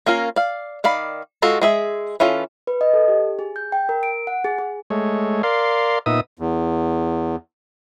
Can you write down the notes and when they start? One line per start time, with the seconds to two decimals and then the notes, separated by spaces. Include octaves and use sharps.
0.06 A#3 C#4 F4 A#4
0.36 D5 F5
0.84 D#3 D5 F5 B5
1.42 G#3 F4 F#4 A4
1.62 G#3 G#4 E5
2.20 E3 C#4 F4 A4
2.67 B4
2.81 D#5
2.93 A4
3.08 G4
3.39 G#4
3.56 G6
3.72 G5
3.89 A#4
4.03 D7
4.27 F#5
4.44 G#4
4.58 G#4
4.90 G#3 A3 C#5
5.43 A#4 D5 F5 C6
6.06 A#2 B3 D#4 E5 D#6
6.39 E2